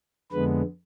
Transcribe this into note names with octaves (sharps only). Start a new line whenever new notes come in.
F2 D3 G#3 B3 B4